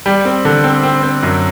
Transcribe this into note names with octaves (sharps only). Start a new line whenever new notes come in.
G3
C4
D3
C4
C4
C4
F#2